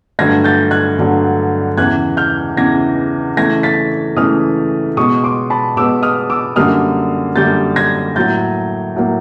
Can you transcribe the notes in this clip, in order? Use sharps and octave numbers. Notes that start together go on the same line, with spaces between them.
G2 D3 F#3 A3 G#6 A#6
G6 A6
F#6 G#6
G2 D3 F#3 A3
E2 C#3 E3 F#6 G#6
F6 G6
E2 C#3 E3 G#6 A#6
C#3 E3 A3 G#6 A#6
A6 B6
C#3 E3 A3 D#6 F6
B2 G#3 B3 C#6 D#6
C6 D6
A5 B5
B2 G#3 B3 D6 E6
D#6 F6
D6 E6
F#2 D3 G3 A#3 D#6 F6
F#2 D3 G3 A#3 G6 A6
G#6 A#6
A2 F#3 A#3 G6 A6
A2 F#3 A#3